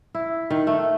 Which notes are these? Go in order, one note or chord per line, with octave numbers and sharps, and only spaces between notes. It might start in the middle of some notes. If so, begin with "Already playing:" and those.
E4
D#3
A3